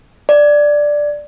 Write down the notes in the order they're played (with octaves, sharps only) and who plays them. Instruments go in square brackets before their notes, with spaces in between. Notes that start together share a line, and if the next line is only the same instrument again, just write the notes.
[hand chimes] D5